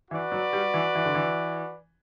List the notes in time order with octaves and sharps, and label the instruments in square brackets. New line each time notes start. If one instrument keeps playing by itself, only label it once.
[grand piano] E3 [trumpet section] F#4 B4 D5
[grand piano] F#3
G3
E3
E3
D3
E3